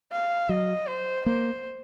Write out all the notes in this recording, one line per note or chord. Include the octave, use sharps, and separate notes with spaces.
F5
F#3 D#5
C5
A#3 C5